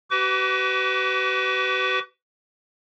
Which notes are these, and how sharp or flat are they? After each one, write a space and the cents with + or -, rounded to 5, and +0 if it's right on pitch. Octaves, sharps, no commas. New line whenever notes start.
F#4 +45 B4 +20 D6 -40